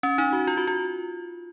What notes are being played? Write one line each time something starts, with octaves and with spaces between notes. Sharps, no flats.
C#4
D#4
F#4
F4
F#4
F4